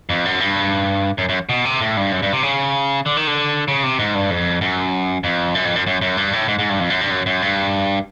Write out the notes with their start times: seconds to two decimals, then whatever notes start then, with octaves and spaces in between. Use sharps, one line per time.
0.09 F2
0.25 F#2
0.40 G2
1.18 F#2
1.29 F#2
1.49 B2
1.65 C3
1.81 A2
1.97 G2
2.12 F#2
2.22 G2
2.33 C3
2.43 C#3
3.06 D3
3.17 D#3
3.27 D3
3.68 C#3
3.83 C3
3.99 G#2
4.15 G2
4.31 F2
4.61 F#2
5.24 F2
5.55 F#2
5.65 F2
5.76 F#2
5.87 F#2
6.02 F#2
6.17 G2
6.33 A2
6.48 G#2
6.59 G#2
6.69 G2
6.80 F2
6.90 F#2
7.01 G2
7.10 F#2
7.26 F#2
7.42 G2